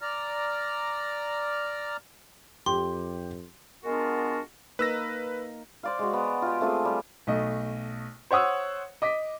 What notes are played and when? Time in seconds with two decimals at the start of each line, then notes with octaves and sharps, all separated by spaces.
0.02 D5 A#5 F6
2.66 F2 G4 C6
3.84 G#3 B3 D4 F4 F#4 A#4
4.79 A#3 D#4 A#4 B4 E6 A#6
5.83 C5 D5 F5
5.99 G#3 F#4
6.13 B3
6.42 F4 G4
6.61 A3 C4 F4 G#4
6.85 G3
7.27 B1 A3 D#5
8.31 C5 C#5 F#5 D#6 E6
9.02 D#5 D6 B6